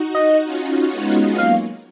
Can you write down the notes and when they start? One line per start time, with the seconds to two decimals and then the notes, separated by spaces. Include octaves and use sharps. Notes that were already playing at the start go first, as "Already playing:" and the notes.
Already playing: D#4 F#4
0.15 D#5
0.45 C#4 F4
0.92 G#3 B3
1.38 F#3 A#3 F5